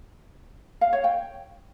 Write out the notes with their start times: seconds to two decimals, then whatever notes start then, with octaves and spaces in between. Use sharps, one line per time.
0.81 F5
0.93 C#5
1.04 G5